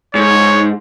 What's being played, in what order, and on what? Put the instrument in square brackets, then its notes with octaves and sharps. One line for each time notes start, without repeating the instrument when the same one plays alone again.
[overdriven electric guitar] G#2 [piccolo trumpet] C#5